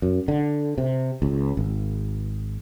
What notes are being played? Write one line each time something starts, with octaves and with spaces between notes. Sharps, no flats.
F#2
D3
C3
C#2
G#1